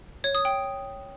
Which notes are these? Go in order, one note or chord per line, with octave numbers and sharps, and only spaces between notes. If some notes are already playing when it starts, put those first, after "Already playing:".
C#5
D#6
G5